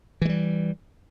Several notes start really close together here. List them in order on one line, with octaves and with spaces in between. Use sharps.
E3 G#3 G3